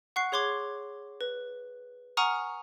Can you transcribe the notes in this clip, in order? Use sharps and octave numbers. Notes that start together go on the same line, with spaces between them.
F#5 C#6 F#6 C7
G#4 C#5 C6 D6 G#6
B4
F#5 G#5 A#5 C#6 D#6 F6